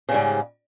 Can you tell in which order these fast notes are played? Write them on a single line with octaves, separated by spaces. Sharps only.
C#3 G3 G#2